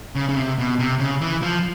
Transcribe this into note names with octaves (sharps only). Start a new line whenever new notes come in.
C#3
C#3
C3
B2
C3
C#3
E3
F3